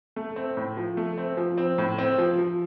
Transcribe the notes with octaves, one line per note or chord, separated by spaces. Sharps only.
A3
C4
A2
F3
A3
C4
F3
C4
A2
C4
F3
F3